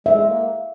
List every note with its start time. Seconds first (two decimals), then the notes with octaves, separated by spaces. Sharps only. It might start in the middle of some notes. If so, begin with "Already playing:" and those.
0.06 G#3 E5
0.25 A#3